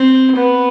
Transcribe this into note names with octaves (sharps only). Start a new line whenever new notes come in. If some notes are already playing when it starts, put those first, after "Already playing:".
Already playing: C4
B3